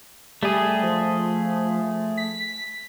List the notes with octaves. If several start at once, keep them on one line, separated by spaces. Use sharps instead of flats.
G3 A3 G#4
F3
B6